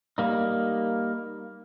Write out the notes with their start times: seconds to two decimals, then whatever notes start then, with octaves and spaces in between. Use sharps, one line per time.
0.18 G3 A#3 D#4